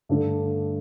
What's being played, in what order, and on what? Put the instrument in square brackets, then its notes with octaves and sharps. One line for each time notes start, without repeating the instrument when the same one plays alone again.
[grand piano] G2 D3 A3 D4 A4